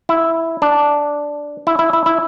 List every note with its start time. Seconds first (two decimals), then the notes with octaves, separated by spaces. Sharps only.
0.09 E4
0.62 D4
1.67 E4
1.79 E4
1.93 E4
2.06 E4